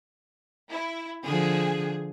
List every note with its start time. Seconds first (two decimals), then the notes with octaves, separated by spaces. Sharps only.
0.70 E4
1.25 D3 F3 G#4